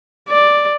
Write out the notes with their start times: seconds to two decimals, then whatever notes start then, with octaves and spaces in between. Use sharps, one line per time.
0.29 D5